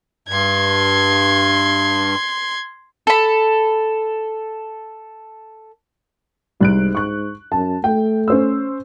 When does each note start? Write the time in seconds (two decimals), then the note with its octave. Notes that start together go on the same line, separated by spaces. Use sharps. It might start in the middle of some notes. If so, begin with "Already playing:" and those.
0.28 G2 C6 G#6
3.07 A4 B5
6.61 C2 G#2 F#6 D7
6.95 C#6 F#6
7.52 F#2 A5
7.84 A3 G5
8.28 C#4 C5 E6